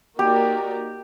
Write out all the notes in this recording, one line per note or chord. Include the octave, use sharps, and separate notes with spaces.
A#3 D#4 F#4 G4 A#4 D5